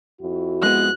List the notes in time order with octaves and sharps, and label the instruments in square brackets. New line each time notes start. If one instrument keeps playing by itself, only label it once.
[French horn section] F2 E4 F#4
[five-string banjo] G#3 B3 [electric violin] F#6